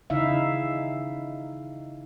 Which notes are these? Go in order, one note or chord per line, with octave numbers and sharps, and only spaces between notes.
C#3 D#4 E4 E5 F5